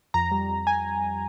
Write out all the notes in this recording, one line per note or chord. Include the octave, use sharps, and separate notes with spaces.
F2 A#5
G3
F2
G#5